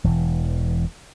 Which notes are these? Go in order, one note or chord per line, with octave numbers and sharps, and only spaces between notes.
E1 E3